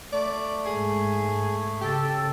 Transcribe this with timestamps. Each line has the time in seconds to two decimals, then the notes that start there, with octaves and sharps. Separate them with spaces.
0.13 A3 D5
0.66 G#2 G#4
1.81 C#3 G4 A4